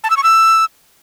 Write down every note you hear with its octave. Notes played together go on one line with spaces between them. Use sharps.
A5
E6
C#6
E6